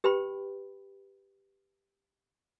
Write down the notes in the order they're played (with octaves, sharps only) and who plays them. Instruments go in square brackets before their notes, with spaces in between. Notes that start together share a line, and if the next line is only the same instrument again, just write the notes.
[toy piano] G4 B4 G5 B5